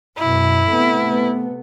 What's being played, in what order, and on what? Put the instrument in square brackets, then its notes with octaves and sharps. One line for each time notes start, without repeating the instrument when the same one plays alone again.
[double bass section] F#2 B2 [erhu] E4
[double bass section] C3 A3 B3